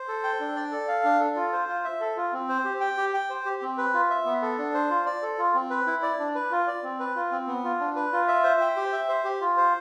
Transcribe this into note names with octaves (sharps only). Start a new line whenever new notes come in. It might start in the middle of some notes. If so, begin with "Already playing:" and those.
Already playing: C5
A4
G5
D4
D5
A4
F5
D4
A4
F4
C5
F4
E5
A4
F4
C4
C5
G4
G5
G4
G5
C5
G4
C4
B4
F4
E5
B3
A4
D4
C5
F4
D5
A4
F4
C4
B4
E4
D5
D4
B4
F4
D5
C4
B4
F4
C4
B3
F4
D4
B4
F4
E5
C5
G5
G4
E5
C5
G4
F4
C5